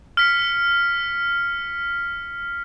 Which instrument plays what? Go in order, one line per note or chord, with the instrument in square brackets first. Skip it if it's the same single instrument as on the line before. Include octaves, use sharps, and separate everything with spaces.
[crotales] F6 B6 C#7